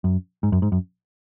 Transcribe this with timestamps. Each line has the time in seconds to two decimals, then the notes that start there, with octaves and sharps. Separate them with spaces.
0.04 F#2
0.43 G#2
0.52 F#2
0.62 G#2
0.72 F#2